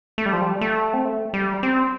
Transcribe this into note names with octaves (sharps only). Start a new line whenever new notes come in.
A3
G3
F3
G3
A3
C4
A3
G3
C4